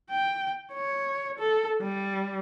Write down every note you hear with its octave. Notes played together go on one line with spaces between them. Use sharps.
G5
C#5
A4
G3